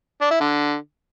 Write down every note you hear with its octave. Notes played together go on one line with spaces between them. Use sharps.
D4
E4
D3